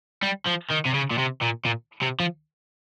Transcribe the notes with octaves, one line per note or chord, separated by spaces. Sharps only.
G3
F3
D#3
C3
C#3
A#2
C3
A#2
A#2
C3
F3